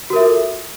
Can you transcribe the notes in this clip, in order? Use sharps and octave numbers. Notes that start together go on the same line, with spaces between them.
F4 F#4 A4 A#4 E5